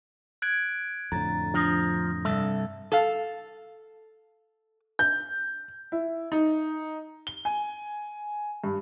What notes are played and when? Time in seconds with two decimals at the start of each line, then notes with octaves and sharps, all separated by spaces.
0.42 F#6 G#6 D7
1.12 F2 A2 D3 A#5 A6
1.54 F3 D4 D#6 A#6
2.25 C2 G2 A4 E5
2.92 A4 F5
4.99 G6
5.92 E4
6.32 D#4
7.27 G7
7.45 G#5
8.64 G2